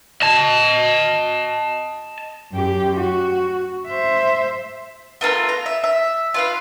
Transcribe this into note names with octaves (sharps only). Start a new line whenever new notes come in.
D#5 A5
F#2 G4
F#4
C5 E5
A3 B3 F4 A#4
A#5
E5
E5
F4 B4 F5